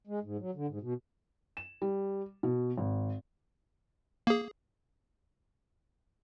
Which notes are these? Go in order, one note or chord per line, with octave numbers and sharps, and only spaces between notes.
G#3
G#2
F#3
D3
G#2
B2
E7
G3
B2
G#1
A#3 G#4